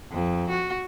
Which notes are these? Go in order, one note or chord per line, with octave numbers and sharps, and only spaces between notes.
F2
F#4